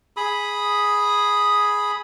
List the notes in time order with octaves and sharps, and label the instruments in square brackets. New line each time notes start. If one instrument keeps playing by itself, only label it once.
[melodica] G#4 B5 D#6